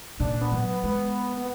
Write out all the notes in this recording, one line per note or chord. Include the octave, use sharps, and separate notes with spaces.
A#2 D4
B3
F#3
B3
G#3 B3
B3